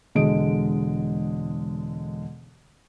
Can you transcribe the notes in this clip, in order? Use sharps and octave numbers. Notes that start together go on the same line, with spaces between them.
E1 D3 G#3 G#4 D#5 D7